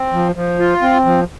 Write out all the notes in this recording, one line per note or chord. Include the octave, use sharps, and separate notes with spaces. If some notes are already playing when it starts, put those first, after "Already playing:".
Already playing: C4
F3
F3
F4
C4
F3